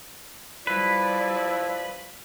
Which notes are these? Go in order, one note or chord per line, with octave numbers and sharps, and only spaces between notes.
F3 G3 E4 B4 D5